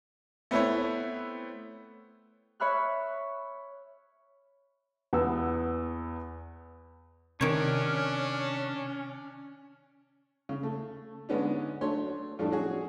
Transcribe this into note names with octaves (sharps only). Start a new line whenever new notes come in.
A3 B3 C4 E4 B4 C#5
C#5 E5 B5 F6 F#6
E2 B3 E6
C3 D#3 C#4 D4 C#5
C#3
A3
G#2 D3 G#3 B3 C#4 D4
F#3 A3 D4 C#5 C6
F2 A2 G3 A3 D4
F#3 C#4 F#4 G#4